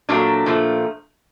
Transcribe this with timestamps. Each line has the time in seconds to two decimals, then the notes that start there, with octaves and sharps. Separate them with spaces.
0.09 A#2 F#3 A3 D4
0.46 A#2 F3 A3